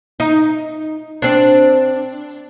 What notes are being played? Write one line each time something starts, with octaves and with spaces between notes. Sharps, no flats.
D#4
C4 D4